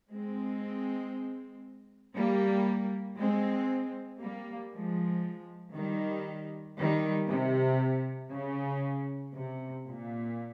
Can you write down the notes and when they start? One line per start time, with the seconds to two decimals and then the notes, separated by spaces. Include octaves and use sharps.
0.11 G#3 C4
2.15 G3 A#3
3.18 G#3 C4
4.21 G3 A#3
4.73 F3 G#3
5.75 D#3 G3
6.78 D#3 G3
7.29 C3
8.32 C#3
9.34 C3
9.86 A#2